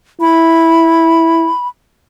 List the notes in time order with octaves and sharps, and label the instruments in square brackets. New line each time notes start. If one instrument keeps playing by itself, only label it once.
[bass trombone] E4 [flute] B5